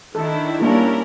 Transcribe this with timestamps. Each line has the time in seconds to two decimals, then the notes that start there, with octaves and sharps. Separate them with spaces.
0.15 D#3 D4 E4 A4
0.61 G3 A#3 C#4 D4 E4 A#4